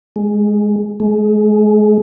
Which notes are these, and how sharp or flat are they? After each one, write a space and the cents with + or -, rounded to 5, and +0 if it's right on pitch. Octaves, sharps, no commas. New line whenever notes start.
G#3 +5
G#3 +30